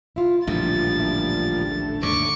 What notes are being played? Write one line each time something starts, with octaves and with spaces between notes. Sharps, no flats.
E4 F4
A1 D2 A#2 F3 G3 E4 A6
D4 E4
A3
D#2 G#2 D3 C#6 D6